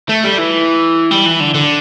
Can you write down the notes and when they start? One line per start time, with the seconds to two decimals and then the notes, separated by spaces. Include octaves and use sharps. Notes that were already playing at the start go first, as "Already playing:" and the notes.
0.09 A3
0.24 G3
0.39 E3
1.11 G3
1.26 E3
1.40 D3
1.54 D3